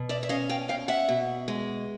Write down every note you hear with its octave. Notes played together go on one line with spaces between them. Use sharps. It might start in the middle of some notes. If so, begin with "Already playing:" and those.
Already playing: B2
D5 E5
E5
C#4 D#5 F5
F5 G5
B2 F5 G5
E5 F#5
B2
G#3